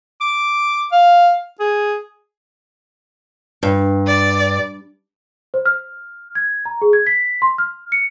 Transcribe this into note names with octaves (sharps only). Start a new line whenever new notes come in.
D6
F5
G#4
G2
D5
C5
F6
G#6
A#5
G#4
G#6
B6
C6
F6
C#7